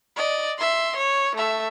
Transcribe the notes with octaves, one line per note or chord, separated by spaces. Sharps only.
D5 D#5
E5 C6
C#5
A3 E5